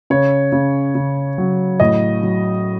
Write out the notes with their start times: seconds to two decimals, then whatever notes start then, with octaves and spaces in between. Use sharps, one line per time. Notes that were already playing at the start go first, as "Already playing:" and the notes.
0.10 C#3 C#5
0.52 C#3
0.95 C#3
1.38 F#3
1.80 A2 D#5
2.23 F#3